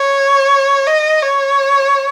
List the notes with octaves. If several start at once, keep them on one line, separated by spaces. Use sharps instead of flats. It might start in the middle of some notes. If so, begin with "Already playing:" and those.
Already playing: C#5
D#5
C#5